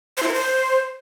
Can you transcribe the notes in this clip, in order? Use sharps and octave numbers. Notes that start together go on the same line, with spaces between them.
C5
E4
A#4
C5